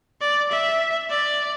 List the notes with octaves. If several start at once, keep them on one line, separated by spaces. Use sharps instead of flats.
D5
E5
D5